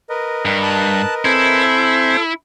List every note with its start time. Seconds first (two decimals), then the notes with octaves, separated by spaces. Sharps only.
0.10 A#4 B4 D#5
0.45 G2
0.63 A5 F#6
1.25 C4 E4 A4 C5 G#5